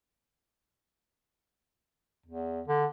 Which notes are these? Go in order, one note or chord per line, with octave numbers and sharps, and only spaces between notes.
E2
D3